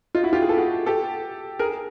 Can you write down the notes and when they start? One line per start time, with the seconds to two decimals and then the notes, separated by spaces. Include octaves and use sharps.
0.15 D#4 F4
0.23 E4 F#4
0.33 F4 G4
0.42 G#4
0.49 A4
0.57 F#4 G#4
0.86 G4 A4
1.59 G#4 A#4